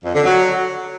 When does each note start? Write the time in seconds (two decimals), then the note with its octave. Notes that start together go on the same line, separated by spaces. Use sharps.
0.04 F2
0.14 D3
0.25 F#3